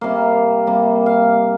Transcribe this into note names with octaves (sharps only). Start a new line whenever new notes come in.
C3 G3 A#3 F5
C3 G3 A#3
F5